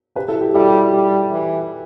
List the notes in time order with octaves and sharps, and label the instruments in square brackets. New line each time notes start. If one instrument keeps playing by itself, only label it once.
[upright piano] G4 B4
E4 A4
G4
[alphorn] G3 [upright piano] E4 A4
[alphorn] G3
E3